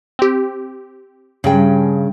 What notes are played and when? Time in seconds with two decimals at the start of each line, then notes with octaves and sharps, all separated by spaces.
0.19 C4 G4
1.44 G2 C#3 G#4 G5